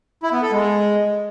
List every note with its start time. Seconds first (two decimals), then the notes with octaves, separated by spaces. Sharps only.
0.23 E4
0.33 B3
0.42 A4
0.52 G#3